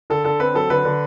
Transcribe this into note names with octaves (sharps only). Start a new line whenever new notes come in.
D3 A4
D3 A4
C4 B4
F#3 A4
D3 B4
D3